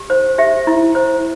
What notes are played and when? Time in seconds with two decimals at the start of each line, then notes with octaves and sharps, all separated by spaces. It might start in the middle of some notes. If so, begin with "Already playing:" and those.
Already playing: G4
0.10 C5
0.38 G4 E5
0.67 E4
0.95 C5